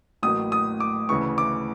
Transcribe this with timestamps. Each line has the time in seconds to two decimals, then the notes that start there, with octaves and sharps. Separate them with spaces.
0.23 A1 A2 F#3 A#3 D#6
0.52 D#6
0.80 D6
1.09 D2 C#3 E3 C#6
1.38 D6